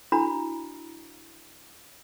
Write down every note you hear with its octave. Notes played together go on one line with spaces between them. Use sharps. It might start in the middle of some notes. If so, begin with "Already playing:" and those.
D4 E4 F#4 A#5 B5